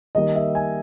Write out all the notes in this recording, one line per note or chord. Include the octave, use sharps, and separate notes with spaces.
D#3 G3 A#3 D#5
E5
G#5